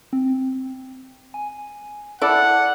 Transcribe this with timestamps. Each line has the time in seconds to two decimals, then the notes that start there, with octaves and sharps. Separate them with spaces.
0.13 C4
1.34 G#5
2.22 E4 A4 D5 F#5